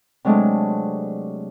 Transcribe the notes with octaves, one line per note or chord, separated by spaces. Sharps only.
C3 F#3 G#3 A3 D4